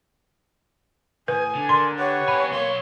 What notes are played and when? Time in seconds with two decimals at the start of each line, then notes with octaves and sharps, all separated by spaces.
1.28 A2 B4 G#5 D#6
1.55 D3
1.69 A#4 D5 C6
1.98 G4 B4 C#5 F#5
2.28 B3 G#5 B5
2.51 B1 A#3 C#5 C6